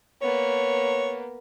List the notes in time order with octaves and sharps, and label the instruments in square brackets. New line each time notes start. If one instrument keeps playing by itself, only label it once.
[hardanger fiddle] A#3 B3 [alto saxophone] C#5